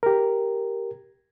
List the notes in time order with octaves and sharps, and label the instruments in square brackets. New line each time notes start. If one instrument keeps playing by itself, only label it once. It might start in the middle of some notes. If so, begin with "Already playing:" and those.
[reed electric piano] G4 A#4